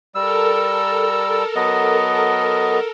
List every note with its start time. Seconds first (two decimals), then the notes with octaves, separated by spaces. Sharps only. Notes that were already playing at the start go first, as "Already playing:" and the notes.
0.15 G3 A4 A#4 E6
1.56 F#3 B3 D#5